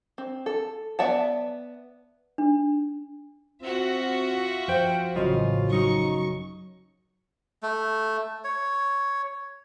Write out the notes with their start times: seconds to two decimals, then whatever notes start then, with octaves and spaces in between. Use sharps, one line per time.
0.18 C4
0.46 A4
0.99 B3 D5 E5 F#5 A5
2.38 D4
3.61 C4 F4 F#4 E5
4.68 F3 C5 F5 G5
5.15 A1 F#2 C#3 F4 D#5
5.71 F#3 D#4 C#6
7.63 A3
8.44 C#5